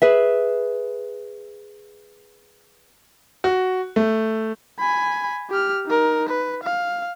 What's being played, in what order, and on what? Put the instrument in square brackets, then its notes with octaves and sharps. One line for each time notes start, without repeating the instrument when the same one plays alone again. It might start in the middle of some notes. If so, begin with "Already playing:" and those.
[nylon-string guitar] G#4 B4 E5
[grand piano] F#4
A3
[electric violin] G#5 B5
G4 F6
D#4 A#4
B4
F5